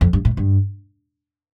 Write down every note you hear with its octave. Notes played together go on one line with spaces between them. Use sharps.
F2
G2
A2
G2